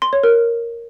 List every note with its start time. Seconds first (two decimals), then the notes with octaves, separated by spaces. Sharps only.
0.02 C6
0.13 C#5
0.24 A#4